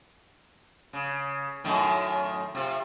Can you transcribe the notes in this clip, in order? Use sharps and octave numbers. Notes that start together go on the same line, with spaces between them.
C#3
F#2 A2 D#3
C3 F4